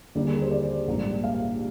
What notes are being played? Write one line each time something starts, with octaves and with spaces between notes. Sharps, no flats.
D#2 D3 G3 A#3 D5
G#4
A#4
C5
D5
A#1 G#2 G3 A#3
F5